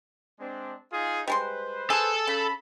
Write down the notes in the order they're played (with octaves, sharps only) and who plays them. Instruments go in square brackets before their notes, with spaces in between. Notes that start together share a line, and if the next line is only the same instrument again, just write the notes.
[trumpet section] G#3 C4 D4
D#4 F4 G#4
[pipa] G3 G#3 C6 [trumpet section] B4 C5
[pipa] G#4 [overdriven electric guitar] A4 A5
[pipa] C#3 [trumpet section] B5